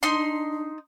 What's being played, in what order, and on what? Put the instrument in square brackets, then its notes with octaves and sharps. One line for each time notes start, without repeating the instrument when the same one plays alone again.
[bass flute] D4 [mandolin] D#4 C6